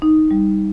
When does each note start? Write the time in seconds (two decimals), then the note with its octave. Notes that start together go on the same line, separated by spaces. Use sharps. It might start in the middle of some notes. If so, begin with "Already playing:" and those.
0.02 D#4
0.31 G3